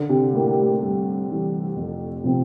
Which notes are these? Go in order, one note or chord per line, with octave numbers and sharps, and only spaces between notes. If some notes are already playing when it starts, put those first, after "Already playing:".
Already playing: D3
C3
A2 A#3 E4 G4
A2
G2
E3 G3
F2
C3 F3 C4 F4